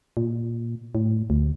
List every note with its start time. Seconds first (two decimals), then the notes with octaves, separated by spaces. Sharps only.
0.17 A#2
0.95 A2
1.30 D2